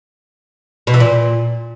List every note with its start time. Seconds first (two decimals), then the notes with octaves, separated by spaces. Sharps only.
0.87 B2
0.94 E3
1.00 A#2